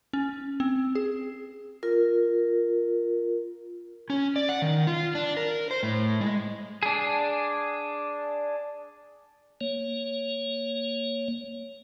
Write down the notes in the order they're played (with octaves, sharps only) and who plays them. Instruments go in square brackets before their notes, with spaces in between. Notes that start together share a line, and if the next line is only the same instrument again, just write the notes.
[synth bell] C#4
C4
G#4
[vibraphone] F4 A#4
[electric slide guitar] C#4
D5
F#5
D#3
F4
D4
A#4
C5
A2
G#3
[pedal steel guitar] D4 G#4
[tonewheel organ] A#3 C#5